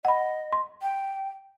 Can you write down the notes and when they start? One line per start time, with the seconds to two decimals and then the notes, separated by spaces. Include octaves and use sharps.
0.05 D#5 F#5 B5
0.53 C6
0.82 G5